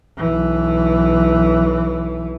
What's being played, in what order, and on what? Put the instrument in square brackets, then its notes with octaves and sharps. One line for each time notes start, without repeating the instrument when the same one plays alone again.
[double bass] B1 E3